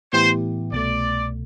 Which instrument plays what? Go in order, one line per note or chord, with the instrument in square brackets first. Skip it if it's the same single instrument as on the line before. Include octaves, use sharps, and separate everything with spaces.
[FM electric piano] A2 E3 B3 E4 G4 [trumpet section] C5
[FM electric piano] C2 B2 A3 [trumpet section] D5